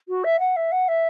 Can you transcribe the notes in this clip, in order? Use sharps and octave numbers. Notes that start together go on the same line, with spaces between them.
F#4
E5
F#5
E5
F#5
E5